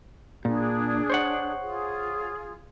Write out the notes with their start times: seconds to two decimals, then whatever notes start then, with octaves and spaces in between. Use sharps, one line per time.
0.45 A#2 D4 G#4
1.10 C5 C#5 F#5
1.62 F4 G#4